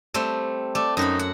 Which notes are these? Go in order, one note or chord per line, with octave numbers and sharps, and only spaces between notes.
G3 A3 C4
A3 D5
F#2 D#4 F#4 B5
F#5